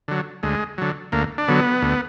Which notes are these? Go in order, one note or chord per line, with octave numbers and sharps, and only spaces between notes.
D3 F#3
D2 G#3
D3 F#3
D2 A#3
D4
D3 F#3 B3
D2